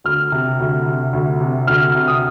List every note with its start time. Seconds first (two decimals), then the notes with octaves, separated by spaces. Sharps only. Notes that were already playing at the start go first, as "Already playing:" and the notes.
0.04 D2 F6
0.32 C3
0.59 D2
0.86 C3
1.13 D2
1.41 C3
1.67 D2 F6
1.95 C3
2.08 D#6